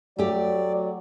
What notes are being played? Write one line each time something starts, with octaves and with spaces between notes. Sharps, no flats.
F#3 A3 G4 D5